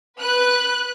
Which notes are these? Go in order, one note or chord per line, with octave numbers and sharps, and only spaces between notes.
B4 F#6